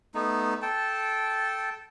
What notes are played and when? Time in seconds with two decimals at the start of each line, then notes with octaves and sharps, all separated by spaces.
0.15 A3 B3 D#4
0.62 A4 G5 A5